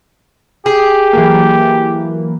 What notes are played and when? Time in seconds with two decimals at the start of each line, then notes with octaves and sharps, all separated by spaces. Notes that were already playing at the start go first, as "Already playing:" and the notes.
0.66 G4 G#4
1.13 E3 F#3 A#3